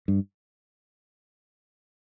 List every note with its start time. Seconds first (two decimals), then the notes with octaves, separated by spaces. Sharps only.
0.08 G2